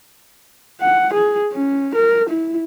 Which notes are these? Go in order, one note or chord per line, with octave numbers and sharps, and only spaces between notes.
F#5
G#4
C#4
A#4
E4